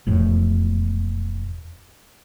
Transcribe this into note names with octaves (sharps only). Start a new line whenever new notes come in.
E1 F2 A2